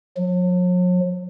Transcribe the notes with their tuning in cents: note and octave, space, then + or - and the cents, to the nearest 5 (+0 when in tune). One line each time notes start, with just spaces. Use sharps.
F#3 -45